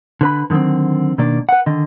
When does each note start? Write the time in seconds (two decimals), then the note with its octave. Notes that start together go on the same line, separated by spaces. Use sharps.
0.21 D3 B4 B5
0.50 D3 D#3 F3 F#3 C4
1.18 B2 D#3 A#3 D4 D5
1.49 B4 F#5
1.66 D3 D#3 D#5